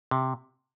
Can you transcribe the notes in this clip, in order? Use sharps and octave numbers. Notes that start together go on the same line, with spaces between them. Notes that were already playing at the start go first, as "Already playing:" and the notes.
C3